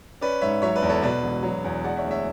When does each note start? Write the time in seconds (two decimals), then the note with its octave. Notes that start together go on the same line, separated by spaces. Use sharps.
0.21 C#4 B4 D5
0.41 G#2 C#5 E5
0.62 F#3 C#5 E5
0.76 B4 D5
0.82 E2
0.89 A4 C#5
1.02 B2 B4 D5
1.23 E1
1.43 F#3
1.64 E2
1.84 G#3 D5 F#5
1.97 C#5 E5
2.05 D2
2.11 C#5 E5